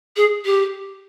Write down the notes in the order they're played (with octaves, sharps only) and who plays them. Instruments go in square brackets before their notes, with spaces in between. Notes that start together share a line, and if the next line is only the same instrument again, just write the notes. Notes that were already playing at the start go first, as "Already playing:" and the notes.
[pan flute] G#4
G4